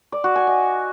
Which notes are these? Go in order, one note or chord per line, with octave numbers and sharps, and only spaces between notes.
D5
F#4
G#5
D#5